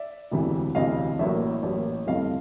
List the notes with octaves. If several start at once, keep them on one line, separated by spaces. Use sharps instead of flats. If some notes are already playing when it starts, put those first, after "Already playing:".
Already playing: D5 E5
E1 D2 C3 E3
E1 D2 C3 E3 D#5 F5
A1 A2 F#3 A#3 D5 E5
A1 A2 F#3 A#3
G1 F2 C3 E3 A3 D#5 F5